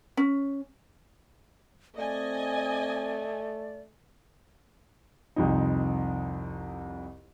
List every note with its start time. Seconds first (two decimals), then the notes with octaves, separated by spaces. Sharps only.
0.17 C#4
1.97 A3 C4 D5 D#5 G#5
5.36 C2 F2 D#4